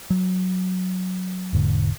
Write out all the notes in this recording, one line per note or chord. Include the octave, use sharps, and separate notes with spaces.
F#3
E1 G#2 D3